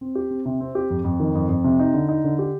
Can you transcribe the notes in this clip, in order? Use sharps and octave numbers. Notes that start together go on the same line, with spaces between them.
C4
G4
C4
C3
C4
G4
F2
F2
D#3
F2
F2
C3
D#4
D3
D#4
D3
G4